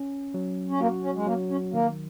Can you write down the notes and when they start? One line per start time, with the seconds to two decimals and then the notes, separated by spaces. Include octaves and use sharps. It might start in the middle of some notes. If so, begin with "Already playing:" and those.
Already playing: C#4
0.34 F#3
0.70 C#4
0.80 A#3 F#4
1.04 C#4
1.15 G#3
1.27 F#3 A#3
1.50 C#4
1.73 D#3 A#3